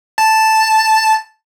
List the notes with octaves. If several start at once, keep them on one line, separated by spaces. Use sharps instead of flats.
A5